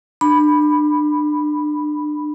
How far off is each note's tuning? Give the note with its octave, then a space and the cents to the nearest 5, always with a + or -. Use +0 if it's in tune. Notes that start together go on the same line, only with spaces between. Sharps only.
D4 +30 B5 +0